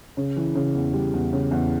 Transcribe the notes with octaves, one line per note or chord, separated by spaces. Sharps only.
C#3
E3
C#3
E2
G3
E2
C#3
E2